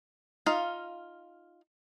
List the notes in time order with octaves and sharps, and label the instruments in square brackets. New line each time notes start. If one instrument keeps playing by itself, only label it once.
[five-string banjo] D#4 F4 F5